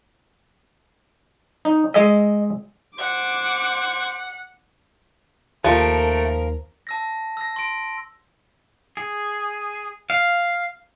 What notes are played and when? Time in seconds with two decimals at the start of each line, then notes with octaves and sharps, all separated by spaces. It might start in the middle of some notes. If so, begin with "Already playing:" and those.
1.65 D#4
1.94 G#3 G#4 D#5 E5
2.98 C5 F#5 D6 G#6
5.64 D#2 F3 A3 A#4 G5
6.87 A5 E6 A#6
7.37 E6 A#6
7.56 C6 A#6 D7
8.97 G#4
10.10 F5